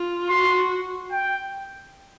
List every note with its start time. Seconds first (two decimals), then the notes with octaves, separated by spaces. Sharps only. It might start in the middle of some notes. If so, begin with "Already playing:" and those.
Already playing: F4
0.29 F#4 C6
1.12 G5